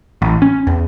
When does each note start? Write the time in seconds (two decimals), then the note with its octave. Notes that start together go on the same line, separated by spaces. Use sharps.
0.22 A1
0.42 C#4
0.67 E2